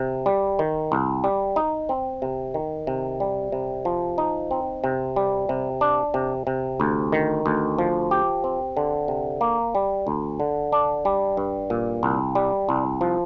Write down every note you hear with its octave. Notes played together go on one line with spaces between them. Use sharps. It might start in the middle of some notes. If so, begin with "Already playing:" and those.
Already playing: C3
G3
D#3
C2
G3
D#4
C4
C3
D#3
C3
G3
C3
F3
D#4
C4
C3
G3
C3
D4
C3
C3
D2
D#3
D2
F3
G4
C4
D3
C3
A#3
G3
D2
D3
D4
G3
G2
A#2
C2
G3
C2
F3